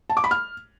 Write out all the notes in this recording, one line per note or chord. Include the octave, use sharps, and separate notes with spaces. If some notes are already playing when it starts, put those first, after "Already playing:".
A5
D6
B5
F6